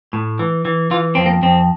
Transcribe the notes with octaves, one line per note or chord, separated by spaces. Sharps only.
A2
E3
E3
E3 F4
F2 C4
A#3
F2 C4